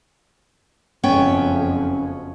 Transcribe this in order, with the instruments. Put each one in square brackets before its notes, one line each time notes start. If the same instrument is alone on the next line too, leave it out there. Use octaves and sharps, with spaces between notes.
[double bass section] F#1 F2 [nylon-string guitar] B3 C#4 G5